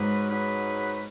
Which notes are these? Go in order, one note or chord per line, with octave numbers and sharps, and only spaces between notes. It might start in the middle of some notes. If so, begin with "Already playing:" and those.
Already playing: G#2 F#3 D#4 G#4 B4
F#3 D#4 G#4 B4